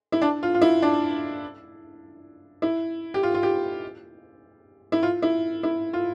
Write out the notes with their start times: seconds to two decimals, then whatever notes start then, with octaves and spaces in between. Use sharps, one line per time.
0.12 E4
0.22 D4
0.43 F4
0.54 F4
0.62 E4
0.82 D4
2.62 E4
3.14 G4
3.23 F4
3.34 F4
3.43 G4
4.92 E4
5.03 F4
5.22 E4
5.63 E4
5.93 F4